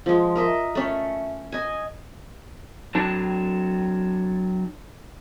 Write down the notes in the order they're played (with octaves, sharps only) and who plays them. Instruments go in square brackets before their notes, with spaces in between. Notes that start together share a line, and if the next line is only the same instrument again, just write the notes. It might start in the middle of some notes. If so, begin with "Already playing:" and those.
[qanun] F3 G#3
A#4 D#5 E5
A3 C#4
D#5 G#5
[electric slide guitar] F#3 D4 A5